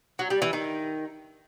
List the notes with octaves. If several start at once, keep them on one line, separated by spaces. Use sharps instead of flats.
F#3
G3
E3
D#3